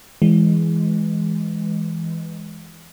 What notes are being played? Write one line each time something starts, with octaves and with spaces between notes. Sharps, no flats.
E3 G#3